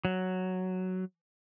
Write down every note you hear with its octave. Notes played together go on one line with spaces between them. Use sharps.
F#3